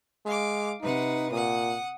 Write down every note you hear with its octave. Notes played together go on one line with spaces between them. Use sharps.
G#3 F5 D6
C3 D#4 B4 F#5
A#2 F#5 D#6